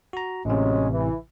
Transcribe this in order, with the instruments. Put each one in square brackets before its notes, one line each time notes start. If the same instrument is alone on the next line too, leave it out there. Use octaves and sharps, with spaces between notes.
[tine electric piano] F#4 A#5
[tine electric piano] A1 A2 C3 [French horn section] F#3 G#3 C#4
[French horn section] E3